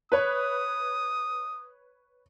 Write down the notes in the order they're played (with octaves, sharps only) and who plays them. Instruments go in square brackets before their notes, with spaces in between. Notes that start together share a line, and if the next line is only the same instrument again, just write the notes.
[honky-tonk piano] B4 C#5 [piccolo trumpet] D#6